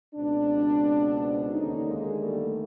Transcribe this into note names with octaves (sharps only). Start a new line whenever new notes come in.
C#2 B2 C4 D4
D#2 D3 C#4 D#4
G#3 A#3
G3 A3